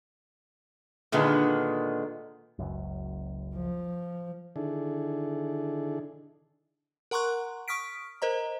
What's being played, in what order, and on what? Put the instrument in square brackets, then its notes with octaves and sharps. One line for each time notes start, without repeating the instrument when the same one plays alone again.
[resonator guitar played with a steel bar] A#2 D3 D#3 G#3 B3
[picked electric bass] F#1 C#2 F#2
[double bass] F3
[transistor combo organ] D3 D#3 D4 E4 G#4 A4
[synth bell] A#4 F#5 A#5 C6 C#6 F#6
C#6 D#6 F6 B6 D7
A#4 C5 D#5 A#5